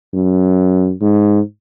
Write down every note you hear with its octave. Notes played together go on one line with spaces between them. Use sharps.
F#2
G#2